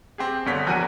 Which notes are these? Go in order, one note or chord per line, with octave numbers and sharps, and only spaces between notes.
C4 G4 G#4
G1 B2 D3 C#5 B6
A#1 E2 F#4 A#4 G#5 D#7